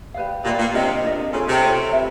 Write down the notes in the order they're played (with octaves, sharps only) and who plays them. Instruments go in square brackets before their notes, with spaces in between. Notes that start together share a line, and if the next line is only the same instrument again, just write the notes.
[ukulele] G4 B4 D5 F5
[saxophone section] A#2 [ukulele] G4 B4 D5 F5
[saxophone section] A#2
[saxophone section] C3 [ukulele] D4 F4 A#4 D#5
[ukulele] D4 F4 A#4 D#5
[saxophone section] C#3 [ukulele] F4 A4 C#5
[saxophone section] C3
[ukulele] F4 A4 C#5
B4 E5